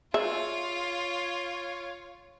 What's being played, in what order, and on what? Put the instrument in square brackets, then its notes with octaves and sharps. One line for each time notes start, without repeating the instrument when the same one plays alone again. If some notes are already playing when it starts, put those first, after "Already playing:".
[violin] F4 [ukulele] G#4 [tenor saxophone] C#5 [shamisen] E5